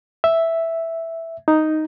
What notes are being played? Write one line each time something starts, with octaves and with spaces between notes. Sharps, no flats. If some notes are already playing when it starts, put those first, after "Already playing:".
E5
D#4